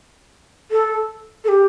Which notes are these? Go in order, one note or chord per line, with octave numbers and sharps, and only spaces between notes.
A4
A4
G4